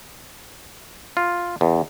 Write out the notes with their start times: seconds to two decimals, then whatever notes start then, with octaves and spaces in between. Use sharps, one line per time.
1.17 F4
1.61 E2